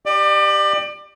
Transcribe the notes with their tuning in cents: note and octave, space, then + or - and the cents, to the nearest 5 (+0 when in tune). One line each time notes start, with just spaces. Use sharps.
G4 +0 D5 +30